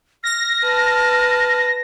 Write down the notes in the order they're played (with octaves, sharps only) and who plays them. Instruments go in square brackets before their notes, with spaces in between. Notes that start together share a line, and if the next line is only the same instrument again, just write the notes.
[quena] F6 [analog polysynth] A#6
[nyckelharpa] B4 A5